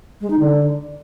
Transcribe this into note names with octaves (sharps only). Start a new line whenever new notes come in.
G#3
D#4
D3